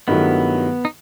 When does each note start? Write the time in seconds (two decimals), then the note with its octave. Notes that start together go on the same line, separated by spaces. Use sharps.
0.08 G2 D#3 F#3 A3 B3 E4
0.85 D#4